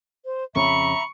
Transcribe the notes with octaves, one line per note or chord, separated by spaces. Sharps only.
C5
F2 C#3 C#4 E5 A#5 B5 C#6